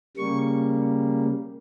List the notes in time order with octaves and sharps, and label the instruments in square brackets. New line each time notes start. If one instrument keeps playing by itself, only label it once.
[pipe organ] C#3 G3 A#3 C#6